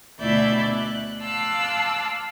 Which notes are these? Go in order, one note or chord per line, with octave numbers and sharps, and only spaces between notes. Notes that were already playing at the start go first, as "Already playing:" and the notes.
D2 B2 E4 D5 E5 G6
F#6
F5 A5 C6 D6 E6 F#6